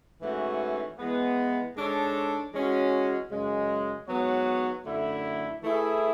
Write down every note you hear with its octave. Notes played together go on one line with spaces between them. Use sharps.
G#2 E3 A3 C#4 F#4
E3 G#3 B3
G#2 G#3 D4 A4 C#5
E3 G#3 C#4 F#4
F#2 C#3 G#3
G#2 F#3 B3 F#4 C#5
F#2 D3 A3 E4
E3 A3 E4 G#4